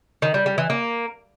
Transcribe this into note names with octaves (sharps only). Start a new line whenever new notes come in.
D#3
G3
G3
E3
A#3